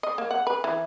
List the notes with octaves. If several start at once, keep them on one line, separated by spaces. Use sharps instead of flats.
D#5
A#3
F#5
B4
E3